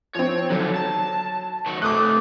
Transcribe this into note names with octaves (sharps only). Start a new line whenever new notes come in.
F3 C4 C#5
D#2 D3 F#3
A5
D#3 F#3
C3 A3 D6 D#6 F#6